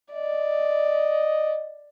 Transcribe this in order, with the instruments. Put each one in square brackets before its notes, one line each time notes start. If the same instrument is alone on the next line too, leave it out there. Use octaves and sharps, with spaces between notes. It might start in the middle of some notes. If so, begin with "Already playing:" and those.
[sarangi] D5 [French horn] D#5